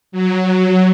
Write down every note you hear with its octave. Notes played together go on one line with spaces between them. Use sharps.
F#3